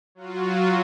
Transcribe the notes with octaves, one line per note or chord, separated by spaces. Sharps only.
F#3 F4 F#4